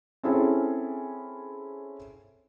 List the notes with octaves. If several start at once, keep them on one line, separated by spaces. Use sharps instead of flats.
C4 C#4 E4 G#4 A4